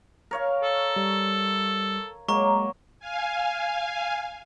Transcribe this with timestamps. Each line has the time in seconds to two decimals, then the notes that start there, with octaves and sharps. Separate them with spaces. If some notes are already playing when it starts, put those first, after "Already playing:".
0.31 A#4 C#5 F5
0.63 A4
0.96 G3
2.29 F#3 G#3 A#3 A#5 C#6
3.00 F5 G#5